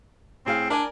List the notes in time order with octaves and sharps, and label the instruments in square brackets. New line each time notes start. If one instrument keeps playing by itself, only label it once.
[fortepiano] A2 G#4 F5 [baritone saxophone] C4
[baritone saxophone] D4 [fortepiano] A#4 D5 G#5